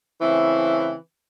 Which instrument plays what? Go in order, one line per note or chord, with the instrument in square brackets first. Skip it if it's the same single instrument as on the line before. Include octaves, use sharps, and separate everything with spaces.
[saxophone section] C#3 E3 A3 C4 E4